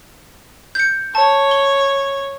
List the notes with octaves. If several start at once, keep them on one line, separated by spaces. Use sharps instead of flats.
G6 C#7
C#5 A5
G7